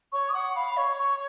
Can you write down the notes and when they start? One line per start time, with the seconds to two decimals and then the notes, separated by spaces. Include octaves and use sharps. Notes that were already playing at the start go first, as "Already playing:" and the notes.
0.12 C#5 C#6
0.29 D#6
0.34 F#5 C#6
0.56 F5 B5
0.77 C#5 C#6
0.99 C#6